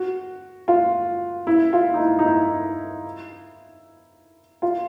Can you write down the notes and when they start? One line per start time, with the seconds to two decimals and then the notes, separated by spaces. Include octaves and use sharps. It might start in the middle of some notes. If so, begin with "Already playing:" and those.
Already playing: F#4
0.68 F4
1.47 E4
1.73 F4
1.94 D#4
1.99 E4
2.19 D#4
2.26 E4
4.62 F4